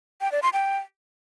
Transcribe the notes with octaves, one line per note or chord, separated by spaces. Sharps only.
G5
D5
C6
G5